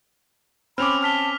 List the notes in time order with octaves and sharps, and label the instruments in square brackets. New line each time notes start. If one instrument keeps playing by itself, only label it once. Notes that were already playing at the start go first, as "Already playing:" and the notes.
[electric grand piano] C4 C#4 D6 [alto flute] B5 [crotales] F6 F7
[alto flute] A5 [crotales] F6 B6 G7